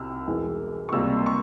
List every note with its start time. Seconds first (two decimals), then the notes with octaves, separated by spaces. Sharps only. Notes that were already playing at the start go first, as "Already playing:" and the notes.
Already playing: C2 C3 G3 E6 F6
0.27 E1 E2 E3 G#3
0.89 C#6
0.92 C#2 C3 G3 A#3 E6
1.17 C6
1.26 C#6